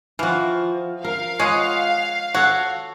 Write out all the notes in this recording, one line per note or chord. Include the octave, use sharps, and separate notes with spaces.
E3 F3 F#4 F5
A#4 F5
G#3 C#5 D#5 F#5
F#4 A4 C#5